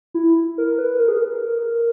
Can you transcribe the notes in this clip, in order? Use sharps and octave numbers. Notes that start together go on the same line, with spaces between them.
E4
A#4
B4
A#4
G#4
A#4